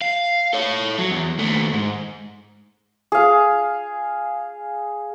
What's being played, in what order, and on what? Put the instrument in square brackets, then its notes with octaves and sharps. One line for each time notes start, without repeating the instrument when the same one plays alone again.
[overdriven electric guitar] F5
A4 C#5
F#3
E2
D#2 A3
G#2
[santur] G#4 F5